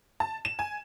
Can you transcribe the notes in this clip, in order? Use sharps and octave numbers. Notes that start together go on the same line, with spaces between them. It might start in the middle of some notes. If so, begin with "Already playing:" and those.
A5
E7
G#5